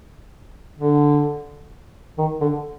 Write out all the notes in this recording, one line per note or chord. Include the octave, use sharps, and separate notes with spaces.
D3
D#3
D3